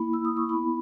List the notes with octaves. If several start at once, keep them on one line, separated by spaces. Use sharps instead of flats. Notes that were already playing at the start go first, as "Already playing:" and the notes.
Already playing: A#3 E4 B5
E6
D#6
C#6
B3 E4 B5